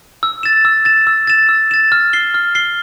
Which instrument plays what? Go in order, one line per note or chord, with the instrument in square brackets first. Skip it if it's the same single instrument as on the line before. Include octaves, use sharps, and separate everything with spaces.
[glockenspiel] E6
A6 E7
E6
A6 E7
E6
A6 E7
E6
A6 E7
F6
C7 G7
F6
C7 G7